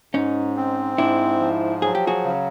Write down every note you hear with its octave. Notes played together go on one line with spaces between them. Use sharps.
G#2 C#4 D#4
C4
G#2 D4 E4
F3
F#3 G#4
G4
F#4 G#4
C#3